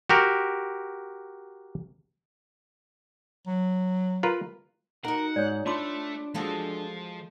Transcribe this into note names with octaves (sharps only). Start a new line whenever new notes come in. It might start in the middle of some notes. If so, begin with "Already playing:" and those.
F#4 G4 A#4
F#3
F4 A#4 B4
D#4 F#4 A#4 F#5
G#2 C#5 D5
A3 D4 F4 C6 D6
F3 G#3 F#4 A4